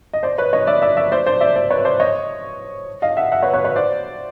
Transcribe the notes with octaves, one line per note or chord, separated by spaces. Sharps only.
D#5
C5 D5
B4 C#5
C#5 D#5
D5 E5
D5 E5
D5 E5
C5 D5
C5 D5
D5 E5
C5 D5
B4 C#5
C5 D5
C#5 D#5
D#5 F5
E5 F#5
E5 F#5
B4 C#5
B4 C#5
B4 C#5
C5 D5